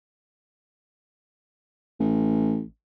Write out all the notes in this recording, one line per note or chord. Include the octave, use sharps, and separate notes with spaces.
A1